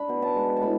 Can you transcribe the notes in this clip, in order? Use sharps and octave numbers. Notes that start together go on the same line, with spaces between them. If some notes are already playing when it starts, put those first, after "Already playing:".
Already playing: D4 B5
B2
A5
G#3
A5
A2 B5